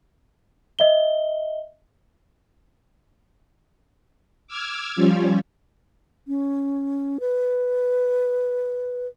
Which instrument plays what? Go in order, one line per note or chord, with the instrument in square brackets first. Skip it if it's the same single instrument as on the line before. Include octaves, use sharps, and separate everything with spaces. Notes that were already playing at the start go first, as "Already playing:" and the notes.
[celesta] D#5 E5 G7
[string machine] D6 E6 F6 G#6
F3 G3 C#4 F4
[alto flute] C#4
B4